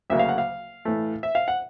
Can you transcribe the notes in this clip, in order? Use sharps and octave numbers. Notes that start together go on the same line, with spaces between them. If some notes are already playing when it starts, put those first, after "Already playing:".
D2 C#3 F#3 A#3 E5
F5
F#5
F5
A2 E3 A3
E5
F5
F#5